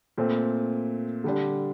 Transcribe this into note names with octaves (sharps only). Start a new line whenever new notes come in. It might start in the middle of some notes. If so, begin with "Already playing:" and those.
A#2 A3 C4
D3 G3 D4